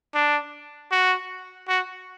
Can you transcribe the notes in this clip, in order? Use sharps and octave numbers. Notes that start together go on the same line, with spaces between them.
D4
F#4
F#4